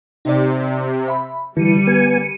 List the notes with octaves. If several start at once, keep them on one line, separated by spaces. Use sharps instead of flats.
C3 D#4 D5
E5 B5
D3 E3 G3 C#7 D#7
B3 G#5